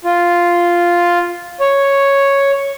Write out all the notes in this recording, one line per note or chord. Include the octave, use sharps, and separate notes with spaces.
F4
C#5